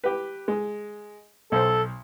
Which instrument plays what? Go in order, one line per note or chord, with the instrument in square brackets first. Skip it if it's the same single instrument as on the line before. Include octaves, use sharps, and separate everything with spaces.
[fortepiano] G4 B4
G#3
[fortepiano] B1 C5 [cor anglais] A4